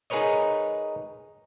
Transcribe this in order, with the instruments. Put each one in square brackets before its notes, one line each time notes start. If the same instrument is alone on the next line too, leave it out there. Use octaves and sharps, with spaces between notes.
[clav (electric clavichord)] D#4 G#4 A#4 B4 C#5 D#5